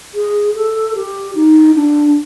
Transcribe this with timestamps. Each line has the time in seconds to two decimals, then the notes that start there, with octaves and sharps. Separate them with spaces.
0.15 G#4
0.55 A4
0.95 G4
1.35 D#4
1.75 D4